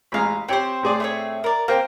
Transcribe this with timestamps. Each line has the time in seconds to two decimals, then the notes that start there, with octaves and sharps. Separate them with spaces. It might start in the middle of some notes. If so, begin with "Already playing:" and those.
0.12 A1 G#3 F5 A#5 B5
0.49 C4 G4 C5 C#5 G5
0.83 A2 G#4 D5
1.00 A3 C4 C#5
1.44 A#4 D5
1.68 A#3 A#4 C5 G5